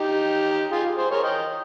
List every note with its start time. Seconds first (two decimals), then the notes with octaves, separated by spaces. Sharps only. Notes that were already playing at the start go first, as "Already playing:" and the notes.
Already playing: D#4 G4
0.71 F4 G#4
0.97 G#4 C5
1.11 A#4 C#5
1.24 D#5 G5